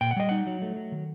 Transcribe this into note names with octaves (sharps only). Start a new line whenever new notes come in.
A#2 G5
F#5
G3 D#5
D#4 F#5
F#3
A3
F#3
D#3